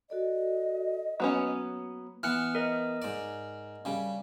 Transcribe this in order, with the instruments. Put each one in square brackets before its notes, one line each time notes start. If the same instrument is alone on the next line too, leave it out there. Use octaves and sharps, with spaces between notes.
[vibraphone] F#4 A4 D5 [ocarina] D#5
[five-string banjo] F#3 B3 C#4 [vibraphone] A#3
[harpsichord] E3 B3 [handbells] F6 F#6 C#7
[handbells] A#4 D#5
[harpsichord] G#2 D5
C#3 G3